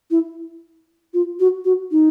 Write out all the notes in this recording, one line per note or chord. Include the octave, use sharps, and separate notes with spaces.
E4
F4
F#4
F#4
D#4